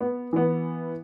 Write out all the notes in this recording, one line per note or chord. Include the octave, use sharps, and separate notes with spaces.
B3
E3 B3